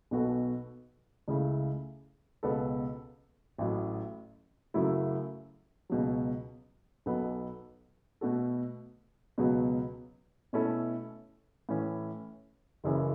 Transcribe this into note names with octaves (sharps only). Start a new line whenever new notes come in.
B1 B2 B3 F#4 A4
C#2 C#3 A3 E4
C#2 B2 B3 A4
A1 A2 F#3
F#2 C#3 F#3 A3 E4
C#2 B2 F#3
B1 B2 F#3 B3 A4
B2 A3 F#4 A4
C#2 B2 F#3 B3
B2 A3 C#4 E4 A4
A2 E3 C#4
F#1 F#2 C#3 E3 C#4